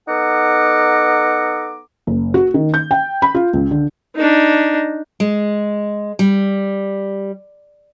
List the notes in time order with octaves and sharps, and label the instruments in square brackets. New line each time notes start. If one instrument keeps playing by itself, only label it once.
[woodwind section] B3 D#4 A4 F#5 A#5 D6
[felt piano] F#1
F#4
D#3
G6
G5
B5
F4
C#2
D3
[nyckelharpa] D4 D#4
[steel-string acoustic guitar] G#3
G3